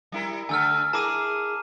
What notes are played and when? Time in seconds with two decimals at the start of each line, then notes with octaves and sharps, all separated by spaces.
0.12 G3 E4 A#4
0.49 D3 A3 G#5 E6 F6
0.93 E4 G#4 A#4 A5 D6 D#7